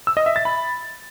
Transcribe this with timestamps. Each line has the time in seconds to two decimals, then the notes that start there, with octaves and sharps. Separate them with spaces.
0.07 E6
0.17 D#5
0.26 E5
0.36 A6
0.45 B5